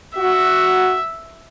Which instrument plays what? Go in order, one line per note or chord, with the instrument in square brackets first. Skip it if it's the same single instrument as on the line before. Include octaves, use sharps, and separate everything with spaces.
[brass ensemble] F#4 [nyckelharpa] E5